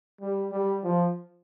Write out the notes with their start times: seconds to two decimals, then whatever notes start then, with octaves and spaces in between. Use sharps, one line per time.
0.21 G3
0.52 G3
0.84 F3